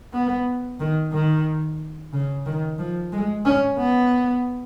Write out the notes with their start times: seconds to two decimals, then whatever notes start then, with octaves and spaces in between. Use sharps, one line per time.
0.13 B3
0.80 D#3
1.12 D#3
2.13 C#3
2.46 D#3
2.79 F3
3.13 G#3
3.45 C#4
3.78 B3